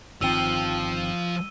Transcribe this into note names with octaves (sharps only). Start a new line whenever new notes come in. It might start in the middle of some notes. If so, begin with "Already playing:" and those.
G1 D#3 F3 C4 E6 D#7 G7